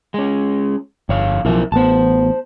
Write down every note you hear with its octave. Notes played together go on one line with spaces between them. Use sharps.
G#3 C#4
G1 F2 C#5 F5
B1 F3 E4 A#4 E5
A1 B3 C5 A5